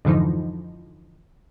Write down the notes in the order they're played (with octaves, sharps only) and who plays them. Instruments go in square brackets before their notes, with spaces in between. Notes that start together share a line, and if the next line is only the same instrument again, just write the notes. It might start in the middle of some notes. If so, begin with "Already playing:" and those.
[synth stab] F2 G#2 D3 E3 F3 D#4